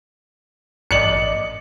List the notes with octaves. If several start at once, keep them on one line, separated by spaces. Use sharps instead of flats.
A1 D5 D#5 C#7 F#7